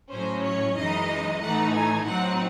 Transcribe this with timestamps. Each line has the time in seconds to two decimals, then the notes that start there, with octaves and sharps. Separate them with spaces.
0.12 A2 F#3 C#4 C5
0.44 C#5
0.76 F#2 E3 G#3 D#4 D#5
1.41 A2 E3 A3 D#4 F#5
1.73 G#5
2.05 A2 F#3 C4 D#4 F#5